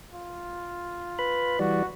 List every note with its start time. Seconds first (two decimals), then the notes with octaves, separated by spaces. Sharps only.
0.14 F4
1.19 B4 B5
1.59 E3 G3 F#4 D5